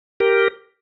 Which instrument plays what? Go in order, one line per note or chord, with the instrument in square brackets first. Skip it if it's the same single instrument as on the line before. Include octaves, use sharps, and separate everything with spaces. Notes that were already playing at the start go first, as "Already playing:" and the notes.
[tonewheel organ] G4 A#4